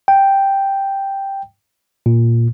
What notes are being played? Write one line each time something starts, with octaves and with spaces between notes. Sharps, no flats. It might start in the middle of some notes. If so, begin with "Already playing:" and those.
G5
A#2